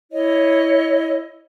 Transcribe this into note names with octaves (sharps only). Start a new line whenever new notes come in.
E4 C#5 D#5